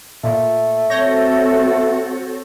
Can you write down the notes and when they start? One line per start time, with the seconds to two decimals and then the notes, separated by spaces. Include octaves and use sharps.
0.24 A#2 A3
0.90 C4 F#4 A4 C#5 G6 A#6